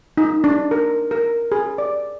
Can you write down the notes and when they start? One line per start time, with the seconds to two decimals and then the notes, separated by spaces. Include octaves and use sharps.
0.17 D#4
0.44 D4
0.71 A#4
1.11 A#4
1.52 G#4
1.78 D5